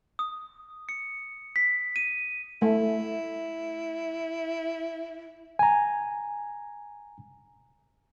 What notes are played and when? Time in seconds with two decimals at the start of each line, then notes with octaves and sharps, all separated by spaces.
0.19 D#6
0.89 C#7
1.56 B6
1.96 D#7
2.62 A3 E4
5.59 G#5 A#5